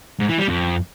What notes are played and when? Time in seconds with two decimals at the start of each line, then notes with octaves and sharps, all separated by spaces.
0.20 G#2
0.29 E3
0.39 G3
0.48 F2